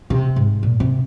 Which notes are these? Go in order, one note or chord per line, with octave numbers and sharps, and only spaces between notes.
C3
G#2
A#2
C3